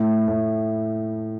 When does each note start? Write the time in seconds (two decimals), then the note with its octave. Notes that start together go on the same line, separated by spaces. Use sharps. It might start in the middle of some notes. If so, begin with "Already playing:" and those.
Already playing: A2
0.28 A2